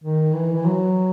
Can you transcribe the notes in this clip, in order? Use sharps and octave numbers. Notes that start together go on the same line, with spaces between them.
D#3
E3
E3
F#3